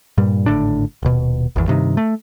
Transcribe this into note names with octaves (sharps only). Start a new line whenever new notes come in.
G2 A#2 G3
G#1 A2 D3 D4
D#1 B2
G#1 E2
G2 C3 D#3
A3